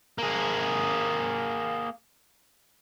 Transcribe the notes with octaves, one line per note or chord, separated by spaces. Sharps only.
A#3 G#4